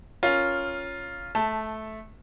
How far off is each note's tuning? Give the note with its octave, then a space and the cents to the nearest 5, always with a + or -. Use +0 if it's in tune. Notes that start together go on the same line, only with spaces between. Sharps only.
C#4 +0 F4 +0 A#4 +10
A3 -15 A5 +0